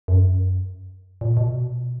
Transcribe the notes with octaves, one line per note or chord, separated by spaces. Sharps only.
F#2
A#2
B2